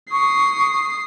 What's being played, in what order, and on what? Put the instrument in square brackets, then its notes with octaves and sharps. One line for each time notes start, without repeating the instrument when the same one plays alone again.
[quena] C#6 [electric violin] D#6 C7